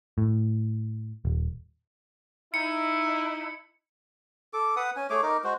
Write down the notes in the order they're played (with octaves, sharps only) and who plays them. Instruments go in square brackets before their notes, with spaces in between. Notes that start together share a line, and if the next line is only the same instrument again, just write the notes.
[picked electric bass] A2
D#1
[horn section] D#4 E4 [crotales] C#7
[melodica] A4 D6
B4 F#5 D#6
C#4 G#5
A3 G#4 C#5 D6
D#4 A#4 D6
G#3 F#4 C5